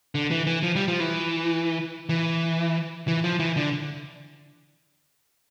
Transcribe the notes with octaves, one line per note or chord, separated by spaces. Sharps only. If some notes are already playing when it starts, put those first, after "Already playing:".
D3
E3
E3
F3
G3
F3
E3
E3
E3
F3
E3
D3